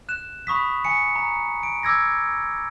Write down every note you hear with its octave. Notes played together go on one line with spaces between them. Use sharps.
F#6 E7
B5 C#6 D#6 B6
G#5 C#7
A#5
D7
D6 E6 G#6 A#6